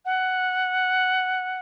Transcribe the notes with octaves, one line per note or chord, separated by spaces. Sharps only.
F#5